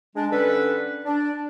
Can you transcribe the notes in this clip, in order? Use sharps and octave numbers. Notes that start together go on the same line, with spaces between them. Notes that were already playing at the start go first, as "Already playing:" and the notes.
G#3 D4
D3 G3 C#4 D4 A4 B4
D4